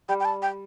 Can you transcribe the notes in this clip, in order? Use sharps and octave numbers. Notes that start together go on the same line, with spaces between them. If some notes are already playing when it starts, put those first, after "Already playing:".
G3 G5
G5
A5
G5